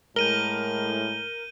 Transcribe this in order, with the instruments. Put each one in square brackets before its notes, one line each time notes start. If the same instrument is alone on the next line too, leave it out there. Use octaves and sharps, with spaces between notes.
[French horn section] A2 G#3 [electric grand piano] A#4 [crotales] G6 D#7 G7